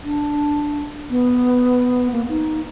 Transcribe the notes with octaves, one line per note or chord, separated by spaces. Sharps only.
D4
B3
A#3
D#4